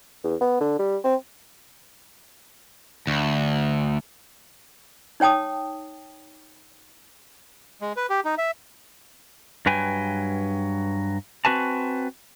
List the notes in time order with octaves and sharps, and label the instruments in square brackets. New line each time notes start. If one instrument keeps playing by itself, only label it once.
[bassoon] E2
B3
D3
G3
C4
[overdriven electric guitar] D2
[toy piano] D#4 C#5 G5 A5 D#6
[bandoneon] G#3
B4
G4
D#4
E5
[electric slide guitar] G2 F#3 B4 G5 G#5
C4 F#4 B4 G#5 A5